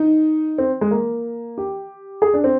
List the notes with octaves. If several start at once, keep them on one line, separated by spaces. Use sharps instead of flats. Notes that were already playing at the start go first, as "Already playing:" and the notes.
Already playing: D#4
C4
G#3
A#3
G4
G#4
D4
C4